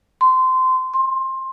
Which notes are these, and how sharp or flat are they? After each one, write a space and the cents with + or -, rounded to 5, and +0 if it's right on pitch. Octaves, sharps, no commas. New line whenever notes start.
C6 -20
C6 +20